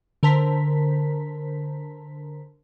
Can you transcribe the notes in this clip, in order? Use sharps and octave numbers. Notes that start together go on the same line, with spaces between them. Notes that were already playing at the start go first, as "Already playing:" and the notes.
D3 A#4 C5 A5 A#5 B6